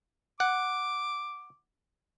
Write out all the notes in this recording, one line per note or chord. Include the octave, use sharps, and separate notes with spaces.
F#5 D6